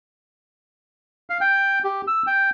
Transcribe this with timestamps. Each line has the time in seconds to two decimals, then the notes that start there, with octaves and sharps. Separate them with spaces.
1.30 F5
1.41 G5
1.84 G4
2.08 E6
2.27 G5